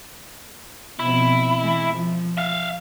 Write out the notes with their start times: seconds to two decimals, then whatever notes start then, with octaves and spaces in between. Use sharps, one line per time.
0.99 B2 F3 C4 E4
1.58 E3 G#3
1.92 F3
2.37 E5 F5